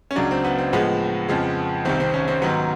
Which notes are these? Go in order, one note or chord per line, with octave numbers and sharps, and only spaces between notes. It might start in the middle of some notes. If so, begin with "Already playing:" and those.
C#4
C#2 C#3 F#3 D4
C4
B3
C4
A2 F3 G#3 B3
F2 C#3 F3 G#3
C2 C3 D#3 C4
C4
C#4
C4
G#2 D#3 F#3 B3